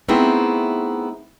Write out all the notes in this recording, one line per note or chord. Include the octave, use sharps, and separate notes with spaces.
A3 B3 C4 D#4 E4 G#4